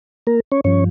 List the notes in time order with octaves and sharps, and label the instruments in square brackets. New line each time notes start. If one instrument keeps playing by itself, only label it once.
[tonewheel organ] A#3 A#4
C#4 C#5
G2 F3 C#4 C#5